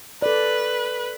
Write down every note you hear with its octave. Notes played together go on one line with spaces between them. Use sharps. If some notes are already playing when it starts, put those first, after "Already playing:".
A4 B4 D5